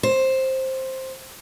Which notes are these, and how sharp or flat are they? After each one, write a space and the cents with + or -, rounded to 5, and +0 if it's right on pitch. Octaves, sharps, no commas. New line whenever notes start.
C5 +10